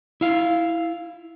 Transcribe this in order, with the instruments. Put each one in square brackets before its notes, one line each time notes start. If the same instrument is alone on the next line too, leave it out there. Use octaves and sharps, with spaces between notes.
[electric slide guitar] E4 F5